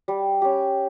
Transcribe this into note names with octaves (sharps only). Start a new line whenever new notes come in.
G3
C#4 G4